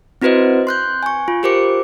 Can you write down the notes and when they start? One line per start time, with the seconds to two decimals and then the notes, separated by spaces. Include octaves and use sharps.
0.22 C4 E4 F#4 B4 C5 D#5
0.67 C6 F#6 G6
1.03 G#5 C#6
1.28 F4
1.43 F4 G4 A#4 C5 D6 C#7